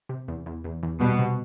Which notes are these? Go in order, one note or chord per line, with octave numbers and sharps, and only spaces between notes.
C3
E2
E2
E2
E2
B2 G3
C3